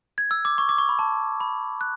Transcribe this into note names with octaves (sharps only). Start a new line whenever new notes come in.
G#6
E6
D6
C#6
D6
C#6
B5
A5
B5
F#6